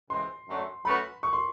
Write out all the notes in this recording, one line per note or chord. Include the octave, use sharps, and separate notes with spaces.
C#3 E3 G#3 C4 C6
F#2 D3 F#3 A3
F#3 A3 C#4 F#4 B4 B5
C#6
C6